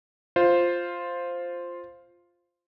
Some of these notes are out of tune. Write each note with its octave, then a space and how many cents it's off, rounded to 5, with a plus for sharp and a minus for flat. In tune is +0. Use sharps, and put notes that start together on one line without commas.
F4 +0 C5 +0